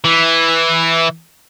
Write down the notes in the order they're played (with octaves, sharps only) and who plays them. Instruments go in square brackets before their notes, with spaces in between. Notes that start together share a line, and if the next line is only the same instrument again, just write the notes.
[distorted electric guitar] E3